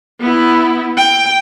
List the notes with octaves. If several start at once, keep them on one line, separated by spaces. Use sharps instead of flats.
B3 E4
G5